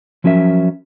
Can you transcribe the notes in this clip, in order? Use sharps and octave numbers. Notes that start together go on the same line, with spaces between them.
F3 F#3 C#4 A#4 E5